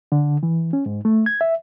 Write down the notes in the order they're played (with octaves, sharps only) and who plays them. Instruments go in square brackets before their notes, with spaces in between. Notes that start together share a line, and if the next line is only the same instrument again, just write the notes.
[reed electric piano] D3
E3
C#4
G#2
A3
G#6
E5